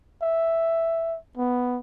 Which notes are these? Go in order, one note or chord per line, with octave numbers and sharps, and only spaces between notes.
E5
B3